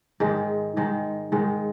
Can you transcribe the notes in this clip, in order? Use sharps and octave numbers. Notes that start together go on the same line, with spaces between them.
G#2 D#3 G#3
G#2 D#3 G#3
G#2 D#3 G#3